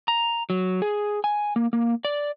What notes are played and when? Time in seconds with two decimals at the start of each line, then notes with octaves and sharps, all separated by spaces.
0.08 A#5
0.50 F#3
0.82 G#4
1.24 G#5
1.56 A#3
1.73 A#3
2.05 D5